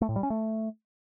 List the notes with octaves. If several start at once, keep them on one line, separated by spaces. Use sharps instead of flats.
A3
A2
G3
C#4
A3